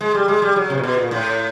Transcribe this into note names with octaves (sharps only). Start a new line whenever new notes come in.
G#3
G3
G#3
G3
F#3
C3
A#2
B2
A#2
A2